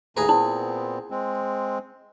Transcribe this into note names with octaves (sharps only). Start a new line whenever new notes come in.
D#2 A2 G#4 B4 A#5
A#2 B3 C4 E4
G#3 C4